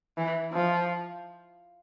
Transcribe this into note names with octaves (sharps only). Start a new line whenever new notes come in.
E3
F3